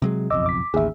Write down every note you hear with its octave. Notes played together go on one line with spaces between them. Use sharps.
C3 F#3 G#3
F#1 B1 F2 D#5 D6 E6
D6 B6
A1 D#2 G#4 E5